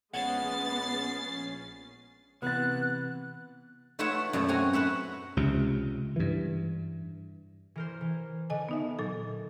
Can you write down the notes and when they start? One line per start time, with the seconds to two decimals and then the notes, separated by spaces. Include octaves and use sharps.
0.13 A#1 G#3 B3 C#4 F#5 A6 C7
2.42 C3 E3 B3 F#6 A6
3.99 A3 F4 B4 C#5 E5 F#5
4.33 F#2 B2 F#3 A3
4.48 C4 F#4 G#5 A#5
4.73 F#4 B4 E5 F#5
5.37 C#2 C3
6.16 G2 E3
7.76 E3 A#4 C5
8.01 E3
8.50 D3 D#5 G#5
8.69 B3 D#4 E5
8.99 A#2 F#3 A4